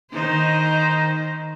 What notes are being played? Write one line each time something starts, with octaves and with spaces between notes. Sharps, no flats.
D#3 D#4 C5